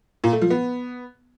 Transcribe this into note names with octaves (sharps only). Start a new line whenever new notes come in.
A#2
A3
F3
B3